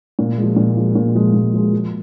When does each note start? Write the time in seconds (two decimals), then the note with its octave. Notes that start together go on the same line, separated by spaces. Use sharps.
0.19 A#2
0.37 G#3
0.43 F3
0.57 A#2
0.77 F3 G#3
0.95 A#2
1.15 F3 G#3
1.34 A#2
1.54 F3 G#3
1.73 F3